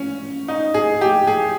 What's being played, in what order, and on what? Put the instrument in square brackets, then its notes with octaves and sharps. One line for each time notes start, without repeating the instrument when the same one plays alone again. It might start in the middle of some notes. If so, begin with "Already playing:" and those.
Already playing: [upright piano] C#4
D#4
G#4
G4
G#4